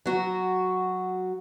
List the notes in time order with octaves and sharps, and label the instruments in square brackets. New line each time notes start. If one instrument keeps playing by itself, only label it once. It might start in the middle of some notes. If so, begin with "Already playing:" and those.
[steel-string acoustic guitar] F#3 F#4